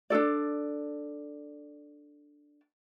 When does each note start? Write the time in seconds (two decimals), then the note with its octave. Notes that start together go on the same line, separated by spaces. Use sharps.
0.10 D4 D#4 A4 D5